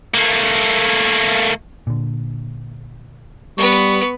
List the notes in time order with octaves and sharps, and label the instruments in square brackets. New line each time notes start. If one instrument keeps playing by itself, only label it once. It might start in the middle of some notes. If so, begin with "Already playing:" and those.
[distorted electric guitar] A3 A#3
[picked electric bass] A#2 D3
[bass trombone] G3 [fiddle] B3 B4 [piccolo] C#6